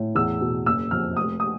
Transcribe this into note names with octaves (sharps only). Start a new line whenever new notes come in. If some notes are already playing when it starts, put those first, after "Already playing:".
Already playing: A2
E2 E6
B2
F#1 E6
F2 F6
F1 D#6
D#6